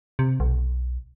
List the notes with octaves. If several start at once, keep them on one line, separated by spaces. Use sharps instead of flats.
C3
B1